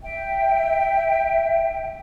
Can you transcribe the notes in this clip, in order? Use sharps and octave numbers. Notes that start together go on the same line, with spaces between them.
E5 G5